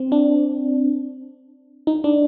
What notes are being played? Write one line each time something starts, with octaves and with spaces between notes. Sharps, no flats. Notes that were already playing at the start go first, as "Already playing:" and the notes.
Already playing: C4
D4
D#4
D4